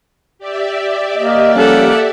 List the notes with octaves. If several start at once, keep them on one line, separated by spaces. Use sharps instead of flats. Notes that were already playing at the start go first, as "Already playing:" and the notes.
G4 D5 E5
A#3 D#5
F3 G3 C#4 A4 F#5